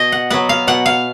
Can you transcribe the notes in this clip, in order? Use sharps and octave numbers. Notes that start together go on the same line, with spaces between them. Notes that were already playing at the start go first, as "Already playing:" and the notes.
Already playing: B2 D#5
F#5
F#3 B3 F#5
F5
B2 F#5
F5